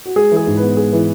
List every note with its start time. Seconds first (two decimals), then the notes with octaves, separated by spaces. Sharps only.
0.06 F#4
0.16 G#3 G#4
0.32 E3 G#4
0.47 G#2
0.57 B3 B4
0.77 G#3 G#4
0.93 E3